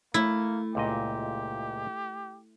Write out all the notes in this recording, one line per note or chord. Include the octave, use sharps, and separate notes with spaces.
A3 A#3 E4
C#2 A#2 G4 D#5